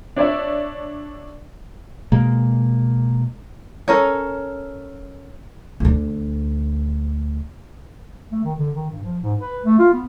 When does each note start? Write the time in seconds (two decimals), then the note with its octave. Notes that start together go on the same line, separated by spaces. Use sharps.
0.16 D4 C#5 D5 E5
2.12 B2 G#3 A#3
3.88 C#4 A4 A#4 C#5
5.80 D2 D3
8.32 A3
8.44 D#3
8.58 D3
8.75 D#3
8.90 G2
9.03 F3
9.22 G#2
9.38 B4
9.65 A3
9.79 F4
9.93 B3